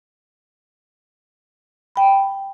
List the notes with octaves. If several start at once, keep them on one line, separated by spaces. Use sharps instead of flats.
G5 B5